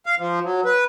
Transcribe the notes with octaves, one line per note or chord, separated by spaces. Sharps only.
F5
F3
F#3
B4